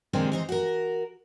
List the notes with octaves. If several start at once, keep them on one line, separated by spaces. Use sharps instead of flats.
C3 D#3 G#3 A#3 C4 D4
E3 D#4 C5
F#4 A#4